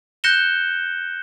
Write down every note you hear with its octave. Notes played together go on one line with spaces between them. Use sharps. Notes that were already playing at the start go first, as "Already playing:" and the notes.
F#6 G6 A#6 C#7 E7 G7